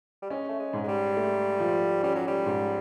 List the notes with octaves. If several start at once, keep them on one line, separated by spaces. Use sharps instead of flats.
G3
G#3 C#4
A3
G#3
G#2
G#3
G3
A3
F3
G3 C#4
F#3
G3
G#2